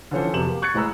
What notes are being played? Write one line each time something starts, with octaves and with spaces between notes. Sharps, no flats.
D3 E3 F3 C#4 A4 C5
F2 C3 F#3 B3 E7 F#7
A#3 G4
C#6 F#6 G#6 A6 C#7
A1 G#3 B4 A#5 E6